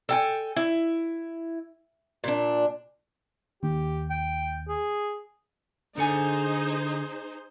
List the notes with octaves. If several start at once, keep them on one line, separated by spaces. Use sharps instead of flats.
A4 G5 G#5
E4
A#2 D4
D#2 G4
G5
G#4
D3 D#4 G#4 A4 C5 G#5